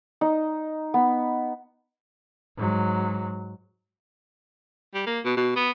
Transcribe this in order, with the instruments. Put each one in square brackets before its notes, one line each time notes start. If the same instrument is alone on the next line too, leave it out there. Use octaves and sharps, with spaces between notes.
[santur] D#4
B3
[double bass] G#2 F#3
[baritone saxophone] G3
A#3
B2
B2
B3